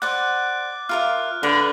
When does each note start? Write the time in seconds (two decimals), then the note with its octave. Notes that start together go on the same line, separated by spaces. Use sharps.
0.02 C5 D5 F#5 D6 F#6
0.89 F4 A#4 E5 F6
1.43 D3 B4